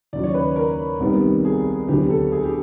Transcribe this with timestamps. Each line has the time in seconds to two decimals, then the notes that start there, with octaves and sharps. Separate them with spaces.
0.13 D#2 C#3 F#3 D5
0.24 C#5
0.35 B4
0.56 A#4
1.00 C2 C3 D#3 G3 B3
1.45 G#4
1.88 D2 D3 F#3 B3 G4
2.10 A4
2.32 G#4
2.43 G4